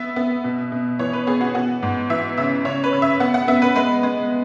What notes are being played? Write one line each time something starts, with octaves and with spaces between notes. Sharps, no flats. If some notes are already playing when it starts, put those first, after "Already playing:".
Already playing: B3 E5
B3
B2
B2
E3 C#5
B4
B3 G#4
F#4
B3 F#4
G#2
E3 E5
C#3 E5
C#3 C#5
B4
C#3
E5
B3 F#5
F#5
B3 E5
B4
G#3 B4
G#3